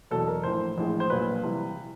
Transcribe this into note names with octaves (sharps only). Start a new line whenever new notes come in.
E2 B2 F#3 A4
A#4
A#1 A2 E3 C5
A#1 A2 E3 G#3
C5
A#1 A#2 F#3 B4
C3 E3 G3